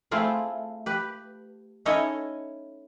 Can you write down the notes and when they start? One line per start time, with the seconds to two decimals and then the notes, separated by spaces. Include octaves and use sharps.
0.11 A3 C4 E4 F4 G#4
0.86 G4 B4
1.85 C#4 D#4 E4 A4 C#5 D#5